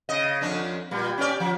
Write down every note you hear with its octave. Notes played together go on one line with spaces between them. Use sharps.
C#3 D#5
F2 C#4 D4
A#2 G3
C#4 G4 D5
F3